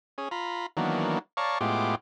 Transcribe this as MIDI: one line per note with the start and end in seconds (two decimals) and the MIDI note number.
0.18 0.29 61
0.18 0.29 68
0.31 0.66 65
0.31 0.66 82
0.31 0.66 83
0.77 1.19 51
0.77 1.19 52
0.77 1.19 54
0.77 1.19 58
0.77 1.19 59
0.77 1.19 62
1.37 1.58 73
1.37 1.58 74
1.37 1.58 77
1.37 1.58 81
1.37 1.58 82
1.37 1.58 85
1.61 1.95 45
1.61 1.95 56
1.61 1.95 59
1.61 1.95 65
1.61 1.95 67
1.61 1.95 86